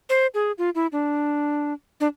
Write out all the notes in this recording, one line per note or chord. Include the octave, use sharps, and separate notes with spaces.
C5
G#4
F4
E4
D4
D4